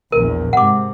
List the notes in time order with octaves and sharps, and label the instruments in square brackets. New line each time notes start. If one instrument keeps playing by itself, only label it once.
[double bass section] A#1 E2 [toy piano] A#4
[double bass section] G#2 C3 [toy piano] F#5 D6